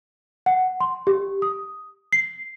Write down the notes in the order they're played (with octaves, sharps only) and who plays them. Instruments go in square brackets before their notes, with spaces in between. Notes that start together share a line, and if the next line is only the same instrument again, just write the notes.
[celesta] F#5
C6
G4
D#6
C7